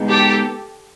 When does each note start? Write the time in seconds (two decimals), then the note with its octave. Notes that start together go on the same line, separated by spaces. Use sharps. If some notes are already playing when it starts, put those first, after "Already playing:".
Already playing: G#3 B3 D#4
0.09 G4 A4